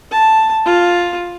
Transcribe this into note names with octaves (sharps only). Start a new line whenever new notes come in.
A5
F4